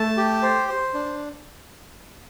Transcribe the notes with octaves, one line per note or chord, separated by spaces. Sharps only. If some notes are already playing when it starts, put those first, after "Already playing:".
Already playing: A3 A5
G4
C5
C5
D4